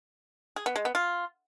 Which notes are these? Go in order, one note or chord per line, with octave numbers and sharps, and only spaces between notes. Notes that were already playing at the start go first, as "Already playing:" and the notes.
G#4
B3
G#3
B3
F4